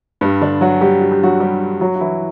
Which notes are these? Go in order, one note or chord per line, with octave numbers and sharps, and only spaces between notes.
G2 G3
D3 D4
F#3 F#4
G3 G4
F#4
G4
F#3 F#4
G3 G4
F#3 F#4
F#4
E3 E4